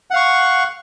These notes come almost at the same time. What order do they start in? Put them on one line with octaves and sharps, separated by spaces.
F#5 F5 C#6